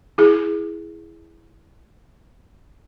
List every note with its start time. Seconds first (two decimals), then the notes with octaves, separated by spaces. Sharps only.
0.18 E4 G#4